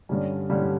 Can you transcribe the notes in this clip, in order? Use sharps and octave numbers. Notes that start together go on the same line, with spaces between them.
G2 D3 G3 C#4
G2 D3 G3 C#4